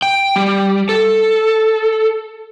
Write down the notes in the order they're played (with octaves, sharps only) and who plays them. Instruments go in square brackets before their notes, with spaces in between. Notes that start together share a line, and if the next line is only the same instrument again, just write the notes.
[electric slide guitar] G5
G3
A4